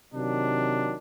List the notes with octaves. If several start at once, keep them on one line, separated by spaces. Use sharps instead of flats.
C3 D#3 F#3 D4